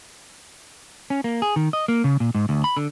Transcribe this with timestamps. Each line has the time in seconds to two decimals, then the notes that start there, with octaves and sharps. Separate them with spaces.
1.10 C#4
1.24 A#3
1.42 G#4
1.56 D#3
1.73 D#5
1.88 A#3
2.04 C#3
2.20 A#2
2.35 G#2
2.49 D2
2.64 B5
2.77 D3